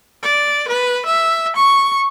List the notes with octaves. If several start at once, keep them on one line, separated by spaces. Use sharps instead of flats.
D5
B4
E5
C#6